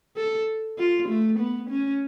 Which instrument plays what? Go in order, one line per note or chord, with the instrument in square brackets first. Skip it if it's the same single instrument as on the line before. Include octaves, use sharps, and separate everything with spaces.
[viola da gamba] A4
F4
A3
B3
C#4